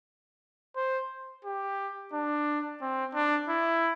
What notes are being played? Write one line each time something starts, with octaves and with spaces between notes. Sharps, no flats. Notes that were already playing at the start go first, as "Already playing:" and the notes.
C5
G4
D4
C4
D4
E4